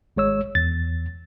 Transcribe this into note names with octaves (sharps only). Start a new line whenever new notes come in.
G#1 G#3 C#5 E6
E2 A6